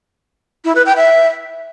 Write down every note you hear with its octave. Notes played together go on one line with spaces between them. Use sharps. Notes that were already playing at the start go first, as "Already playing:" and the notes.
E4
B4
G5
E5